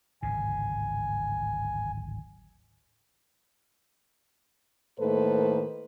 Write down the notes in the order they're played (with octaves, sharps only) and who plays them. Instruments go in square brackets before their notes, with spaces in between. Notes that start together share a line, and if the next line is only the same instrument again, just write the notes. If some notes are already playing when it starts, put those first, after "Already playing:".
[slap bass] D1 G#1 C#3 [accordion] G#5
[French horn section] A2 D#3 A#3 A4 B4 C5